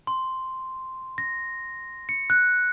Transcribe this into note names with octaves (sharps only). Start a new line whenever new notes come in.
C6
A#6
C#7
F#6